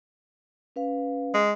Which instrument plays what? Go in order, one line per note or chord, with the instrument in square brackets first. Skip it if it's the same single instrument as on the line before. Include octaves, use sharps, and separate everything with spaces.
[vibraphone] C#4 B4 F5
[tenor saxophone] G#3